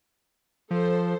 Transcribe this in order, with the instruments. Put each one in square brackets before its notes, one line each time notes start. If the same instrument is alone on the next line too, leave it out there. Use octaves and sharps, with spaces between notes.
[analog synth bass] F3 [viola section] A4 C5